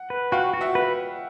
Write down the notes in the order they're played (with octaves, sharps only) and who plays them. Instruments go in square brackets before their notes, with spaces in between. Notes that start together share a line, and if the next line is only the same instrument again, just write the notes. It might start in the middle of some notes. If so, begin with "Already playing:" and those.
Already playing: [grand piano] F#5
[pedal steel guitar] B4
[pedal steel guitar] F#4 [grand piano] F5 G5
[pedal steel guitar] F#4
[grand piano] E5 F#5
[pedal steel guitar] B4